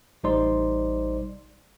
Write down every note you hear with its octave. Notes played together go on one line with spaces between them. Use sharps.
A1 G3 D#4 C5 D5 C6